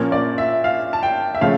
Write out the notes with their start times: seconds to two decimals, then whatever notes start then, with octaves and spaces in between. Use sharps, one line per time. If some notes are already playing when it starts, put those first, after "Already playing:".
Already playing: A#2 F3 A#3 C#4
0.12 D5
0.38 E5
0.64 F5
0.93 A5
1.03 G5
1.35 E5
1.41 C#3 F3 A3 C#4 F5